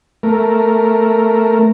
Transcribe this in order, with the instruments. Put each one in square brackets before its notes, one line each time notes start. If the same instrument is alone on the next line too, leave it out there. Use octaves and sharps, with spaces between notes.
[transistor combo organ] A3 A#4